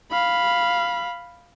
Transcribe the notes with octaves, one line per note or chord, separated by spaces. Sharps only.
F5 B5